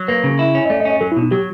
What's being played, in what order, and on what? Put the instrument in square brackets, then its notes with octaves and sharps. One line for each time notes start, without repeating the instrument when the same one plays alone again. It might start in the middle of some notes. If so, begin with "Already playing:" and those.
Already playing: [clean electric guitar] F#3
[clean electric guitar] A#3 [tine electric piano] B4
[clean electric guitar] C#3
E4
C#4
[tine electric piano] D#5
[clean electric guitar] A3 [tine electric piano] D5
[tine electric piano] D#5
[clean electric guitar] C#4
[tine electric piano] D#5
[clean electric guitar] F#3 [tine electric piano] A4
[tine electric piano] E4
[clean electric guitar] B2
[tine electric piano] D#4
[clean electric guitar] F#3 [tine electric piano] G4